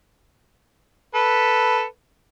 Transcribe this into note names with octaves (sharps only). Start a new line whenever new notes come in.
A4 B4